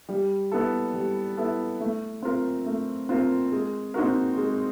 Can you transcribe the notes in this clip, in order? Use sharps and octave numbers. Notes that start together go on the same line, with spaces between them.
G3
B3 E4 A4
G3
B3 E4 A4
A3
C4 F4 A#4
A3
C4 F4 A#4
G#3
C4 D#4 F#4 A#4
G#3